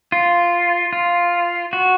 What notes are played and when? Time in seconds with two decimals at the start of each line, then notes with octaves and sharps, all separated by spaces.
0.12 F4
0.93 F4
1.73 F#4